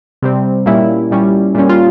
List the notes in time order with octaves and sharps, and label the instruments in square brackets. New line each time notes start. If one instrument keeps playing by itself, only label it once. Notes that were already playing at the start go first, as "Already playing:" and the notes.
[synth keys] C3 G3 C4
A#2 G3 A#3 C#4 E4
A#2 G3 C#4
A#2 G3 C#4
F4